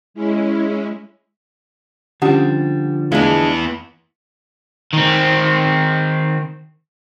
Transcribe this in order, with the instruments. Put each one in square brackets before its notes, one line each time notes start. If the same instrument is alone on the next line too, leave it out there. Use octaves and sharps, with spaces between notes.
[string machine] G#3 C#4 E4
[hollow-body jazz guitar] D3 F3 [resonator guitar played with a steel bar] G3 [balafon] C#4 G4 F#5
[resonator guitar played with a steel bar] G#3 D4 [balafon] A3 [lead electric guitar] B3 E4
[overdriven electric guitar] D#3 C4